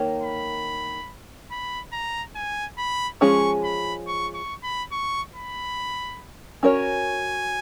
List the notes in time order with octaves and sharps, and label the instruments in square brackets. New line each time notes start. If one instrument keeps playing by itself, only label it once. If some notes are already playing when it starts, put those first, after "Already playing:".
Already playing: [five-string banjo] D#3 A#3 A#4 C#5
[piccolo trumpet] B5
B5
A#5
G#5
B5
[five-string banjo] F3 G#3 C#4 G#4 [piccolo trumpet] C#6
[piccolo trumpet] B5
C#6
C#6
B5
C#6
B5
[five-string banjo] C#4 F#4 A#4 C#5 [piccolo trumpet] G#5